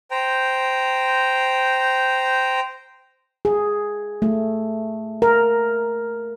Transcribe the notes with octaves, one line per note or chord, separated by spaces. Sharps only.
C5 G5 A#5
G#4
A3
A#4